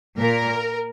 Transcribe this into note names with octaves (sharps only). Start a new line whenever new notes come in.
A#2 A#4